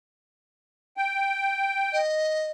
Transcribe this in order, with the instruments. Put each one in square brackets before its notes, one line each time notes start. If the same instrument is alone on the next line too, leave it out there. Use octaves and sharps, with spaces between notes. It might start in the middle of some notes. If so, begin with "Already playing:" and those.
[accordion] G5
[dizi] D#5